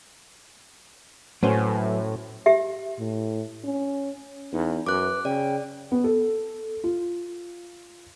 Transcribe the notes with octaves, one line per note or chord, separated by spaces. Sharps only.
A2 F#3 A3 C#4 F#4 B4 C5
G4 E5
A2
C#4
E2 D#4
F#2 B4 D6 F#6
C#3 D5 G5
B3
A4
F4